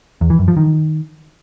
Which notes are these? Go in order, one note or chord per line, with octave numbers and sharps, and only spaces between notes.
E2
E3
F#2
F3
D#3